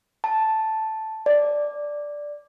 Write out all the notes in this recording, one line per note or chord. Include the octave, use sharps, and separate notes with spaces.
A5
D5